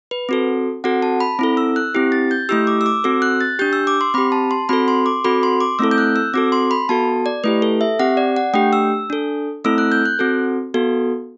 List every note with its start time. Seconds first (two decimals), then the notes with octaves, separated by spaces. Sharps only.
0.11 B4
0.29 C4 F#4 A4
0.84 C4 F#4 A4 F#5
1.02 A5
1.20 B5
1.39 C4 E4 A4
1.57 E6
1.76 F#6
1.94 C4 E4 G4
2.12 A6
2.31 G6
2.49 A3 E4 G4 E6
2.67 D6
2.81 E6
2.86 D6
3.04 C4 F#4 A4 E6
3.22 F#6
3.41 A6
3.59 D4 G4 G6
3.73 E6
3.87 D6
4.01 C6
4.14 C4 B5
4.18 G4
4.32 A5
4.51 C6
4.69 C4 F#4 A4 B5
4.88 C6
5.06 D6
5.24 C4 F#4 A4 B5
5.43 C6
5.61 D6
5.79 A3 C4 E4 A4 E6
5.91 G6
5.98 F#6
6.16 E6
6.34 C4 F#4 A4 D6
6.52 C6
6.71 B5
6.89 B3 F#4 A4 A5
7.26 D5
7.44 A3 E4 G4 B4
7.62 A4
7.81 E5
7.99 C4 G4 F#5
8.17 D5
8.36 F#5
8.54 A3 D4 G4 G5
8.73 E6
9.10 D4 A4
9.64 A3 C4 E4 A4 E6
9.78 F#6
9.92 G6
10.05 F#6
10.19 C4 F#4 A4
10.74 B3 F#4 A4